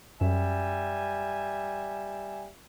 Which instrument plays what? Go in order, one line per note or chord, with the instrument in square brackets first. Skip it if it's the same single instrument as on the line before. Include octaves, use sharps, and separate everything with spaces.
[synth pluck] F#2 [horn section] G3 E5 G#5